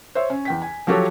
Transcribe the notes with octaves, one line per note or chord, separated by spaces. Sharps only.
C5 C#5 E5
C#4
E2 G5 B6
G#5
F3 F#3 F#4 G4 A4 C#5